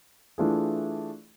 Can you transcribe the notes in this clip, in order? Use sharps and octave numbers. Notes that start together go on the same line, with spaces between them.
E3 A3 D4 F4 G#4